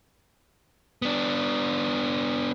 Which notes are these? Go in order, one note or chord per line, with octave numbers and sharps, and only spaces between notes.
B3 D4